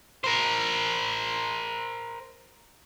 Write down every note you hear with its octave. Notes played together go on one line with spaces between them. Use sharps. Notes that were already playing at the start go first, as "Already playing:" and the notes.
A#4 C5